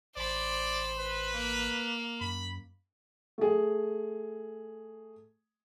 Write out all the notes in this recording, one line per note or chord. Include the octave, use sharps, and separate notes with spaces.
A1 C5 D5 B5
B4
A#3
F#2 B5
A3 G#4